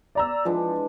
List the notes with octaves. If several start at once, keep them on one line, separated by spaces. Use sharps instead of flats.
D5 A#5 E6
E3 F3 G#3 D4